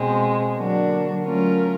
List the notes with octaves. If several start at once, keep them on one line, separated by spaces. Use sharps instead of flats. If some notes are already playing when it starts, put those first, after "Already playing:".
Already playing: B2 G#3 C4
D3 F#3 A#3 D4 F#4
F#3 A3 C#4 F4 A#4